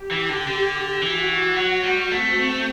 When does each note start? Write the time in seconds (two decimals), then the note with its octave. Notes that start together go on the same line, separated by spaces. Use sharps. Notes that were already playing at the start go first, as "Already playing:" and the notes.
Already playing: G4
0.11 E3
0.29 D3
0.47 D3
1.01 E3 F#4
1.56 F#3
1.83 G3
2.11 A3 C4